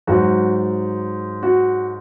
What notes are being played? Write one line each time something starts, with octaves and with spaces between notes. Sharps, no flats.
G#2 F#3 F#4
F#4